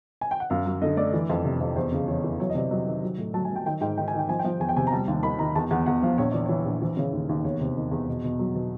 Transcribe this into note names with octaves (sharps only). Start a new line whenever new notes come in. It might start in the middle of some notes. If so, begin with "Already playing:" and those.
G#5
G5
F#5
F#2 F5
F#3
D3 D#5
A3 D5
E3
F2
C3
F2
E2 C5
C#3
E3 C#5
E3
F#3 C#5
D#5
C3 D5
F#3 D#5
D#3
F#3
A2
F#3 A5
G#5
F#3
G5
D#3 G5
G#2 G5
D#3 G5
G#5
D#3
G5
F3 G#5
G5
F3
E2 G#5
G5
C3 G#5
A#5
G3 A5
D#2
D#3 B5
D#3 A#5
E2 A5
E2 F#5
E2 F#5
F3 F5
A#1 C#5
E3 D5
E3 C#5
A#1
E3 C5
C#3 C#5
D#2
D#2
E2 C#5
C3
D#3
E2
B2
B2
F#3
B2